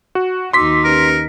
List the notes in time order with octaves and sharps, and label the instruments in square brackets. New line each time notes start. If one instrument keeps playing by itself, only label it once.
[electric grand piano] F#4
[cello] D#2 D#4 [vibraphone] F#4 D6 E6 [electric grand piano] C6 B6
[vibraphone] C#4 G4 B4 [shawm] A#4